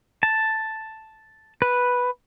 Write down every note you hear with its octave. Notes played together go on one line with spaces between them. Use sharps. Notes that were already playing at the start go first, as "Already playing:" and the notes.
A5
B4